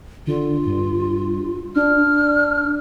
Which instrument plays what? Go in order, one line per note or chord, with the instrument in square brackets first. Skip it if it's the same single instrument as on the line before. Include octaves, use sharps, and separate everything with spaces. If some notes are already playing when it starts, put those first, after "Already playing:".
[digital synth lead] D3 [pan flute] F4
[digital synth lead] G2
[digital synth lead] D4 [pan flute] F6